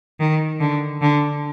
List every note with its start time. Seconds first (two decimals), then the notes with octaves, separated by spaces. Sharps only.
0.20 D#3
0.60 D3
1.02 D3